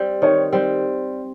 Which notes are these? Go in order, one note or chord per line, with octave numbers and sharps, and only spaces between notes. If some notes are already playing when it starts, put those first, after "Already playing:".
Already playing: G3 C4
D#3 C#5
G3 C4